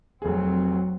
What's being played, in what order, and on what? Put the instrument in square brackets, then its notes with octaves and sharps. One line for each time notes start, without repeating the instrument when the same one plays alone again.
[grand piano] F1 G#4 [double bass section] F#3 C4